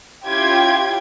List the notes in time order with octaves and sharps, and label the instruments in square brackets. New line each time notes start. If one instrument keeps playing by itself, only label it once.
[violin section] C#4 E4 F4 G4 G5 G#6